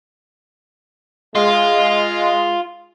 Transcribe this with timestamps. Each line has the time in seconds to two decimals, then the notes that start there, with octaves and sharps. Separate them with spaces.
1.35 G#3 F4